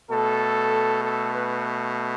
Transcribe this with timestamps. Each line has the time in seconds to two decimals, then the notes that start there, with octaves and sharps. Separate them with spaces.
0.11 B2 A3 A4
1.04 A4
1.35 B4